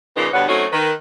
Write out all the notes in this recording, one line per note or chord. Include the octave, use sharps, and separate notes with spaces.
A#2 C#3 F3 A#3 D#4 B4
G2 B2 D3 B3 C#5 F#5
F#3 A3 C4 C#4 D#4 F#4
D#3 B4